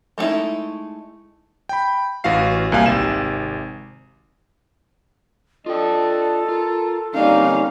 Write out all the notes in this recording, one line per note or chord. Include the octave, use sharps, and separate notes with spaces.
G#3 A3 B3 D#4 E4
G5 B5
A1 E3 F#4 F5 C7
C2 A#3 E4 F5 G#5
G#1 C3 E7
D4 F4 A4 D#5 G5
F4 A#4
D3 G3 A#3 C4 C#4 D#4 D5 F5